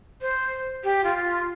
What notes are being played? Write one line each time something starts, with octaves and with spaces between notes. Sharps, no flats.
C5
G4
F4